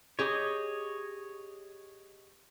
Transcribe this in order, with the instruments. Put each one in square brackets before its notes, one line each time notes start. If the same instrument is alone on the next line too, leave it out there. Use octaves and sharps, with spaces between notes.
[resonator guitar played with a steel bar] G4 G#4 [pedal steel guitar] C#5 D#5